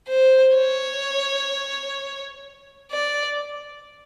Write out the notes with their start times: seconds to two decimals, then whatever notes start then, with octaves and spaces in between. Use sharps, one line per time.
0.08 C5
0.55 C#5
2.91 D5